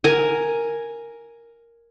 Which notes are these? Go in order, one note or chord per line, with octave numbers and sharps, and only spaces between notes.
A#4 G#5